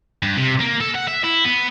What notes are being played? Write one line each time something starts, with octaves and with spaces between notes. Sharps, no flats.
G2
C3
A#3
A4
F#5
E5
E4
B3